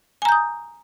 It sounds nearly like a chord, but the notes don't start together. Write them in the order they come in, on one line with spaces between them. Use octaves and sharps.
G#5 A#5 G6 D#6